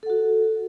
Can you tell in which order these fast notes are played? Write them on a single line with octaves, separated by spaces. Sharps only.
A4 F#5 F#4